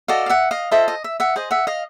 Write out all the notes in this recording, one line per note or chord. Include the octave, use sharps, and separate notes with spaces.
F#4 A4 D5 D#5 F5
F5
E5 F#5
D#5 F5
F4 A4 C5 D#5 E5
D#5
E5
E5 F#5
G#4 C5 D#5
E5 F#5
D#5 F5